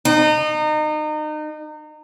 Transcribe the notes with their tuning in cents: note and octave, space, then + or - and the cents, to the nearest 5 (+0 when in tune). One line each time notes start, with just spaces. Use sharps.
D#4 -30